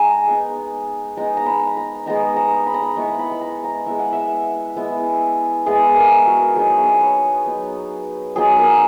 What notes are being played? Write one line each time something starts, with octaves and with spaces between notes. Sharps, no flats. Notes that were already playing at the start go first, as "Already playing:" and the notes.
Already playing: G#3 D#4 G#5 A#5
G#3 B3 D#4
G#3 B3 D#4 A#5
A#5
B5
A#5
G#3 B3 D#4 A#5
A#5
B5
A#5
B5
G#3 B3 E4 C#6
B5
B5
A#5
A#5
G#3 B3 E4 E5
F#5
E5
G#3 B3 E4
G#3 B3 E4 G#4
A#4
F#4
F#3 B3 D#4 G#4
E5
D#5
C#5
B4
F#3 B3 D#4
F#3 B3 D#4 G#4
A#4